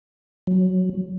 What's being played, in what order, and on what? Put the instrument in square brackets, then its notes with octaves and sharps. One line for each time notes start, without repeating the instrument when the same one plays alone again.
[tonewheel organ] F#3